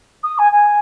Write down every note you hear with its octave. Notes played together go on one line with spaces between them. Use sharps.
D#6
G#5
G#5